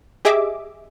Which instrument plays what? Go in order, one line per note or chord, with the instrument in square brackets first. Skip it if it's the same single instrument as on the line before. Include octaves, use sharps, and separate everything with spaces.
[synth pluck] G4 G#4 D#5 E5 D6